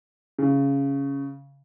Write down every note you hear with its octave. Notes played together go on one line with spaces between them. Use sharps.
C#3